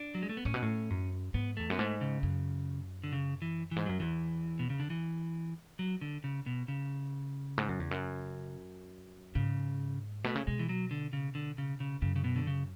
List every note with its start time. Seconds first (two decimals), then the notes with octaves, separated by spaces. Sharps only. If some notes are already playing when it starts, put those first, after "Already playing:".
Already playing: D4
0.15 F#3
0.22 G#3
0.29 A3
0.37 B3
0.45 A2 C#4
0.54 B2
0.62 A2
0.90 F#2
1.34 G#2 B3
1.57 E2 A3
1.70 F#2 B3
1.79 G#2 A3
2.01 C#3
2.23 F#2
3.03 D3
3.13 C#3
3.42 E3
3.71 G#2 E3
3.86 F#2 F#3
4.00 E2 E3
4.59 B2
4.70 C#3
4.80 D3
4.90 E3
5.79 F#3
6.01 D3
6.24 C#3
6.46 B2
6.68 C#3
7.58 G#2
7.69 F#2
7.80 E2
7.91 F#2
9.35 G#2 C#3
10.24 B2 A3
10.35 C#3
10.47 B2 G#3
10.59 E3
10.69 F#3
10.91 D3
11.13 C#3
11.35 D3
11.58 C#3
11.80 C#3
12.02 F#2 C#3
12.16 C#3
12.24 B2
12.36 D3
12.47 C#3